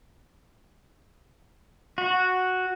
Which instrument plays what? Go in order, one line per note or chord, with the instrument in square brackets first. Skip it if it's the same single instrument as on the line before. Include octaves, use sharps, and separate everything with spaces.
[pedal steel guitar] F#4